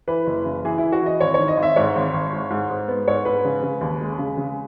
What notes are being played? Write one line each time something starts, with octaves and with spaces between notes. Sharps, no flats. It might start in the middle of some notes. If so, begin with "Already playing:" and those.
E3 B4
F#1
C#3
E3 G#4
E3 E4
F#4
E3 D#5
G#1 C#5
D#3 C#5
D#5
G#1
E5
G#2 C#5
G#1
G#1
G#2
G#2
G#2
B3
G#2 C#5
G#2 B4
C#3
C#3
D#2
G#3
C#3
C#3